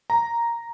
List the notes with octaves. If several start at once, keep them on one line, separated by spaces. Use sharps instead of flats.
A#5